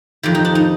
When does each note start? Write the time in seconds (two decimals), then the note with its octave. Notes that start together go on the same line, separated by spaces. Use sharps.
0.23 F2 D#3 G4
0.35 D#4
0.45 D4
0.55 D#4